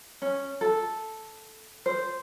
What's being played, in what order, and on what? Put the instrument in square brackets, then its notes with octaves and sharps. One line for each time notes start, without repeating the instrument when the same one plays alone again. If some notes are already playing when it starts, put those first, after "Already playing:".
[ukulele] C#4
A4
C5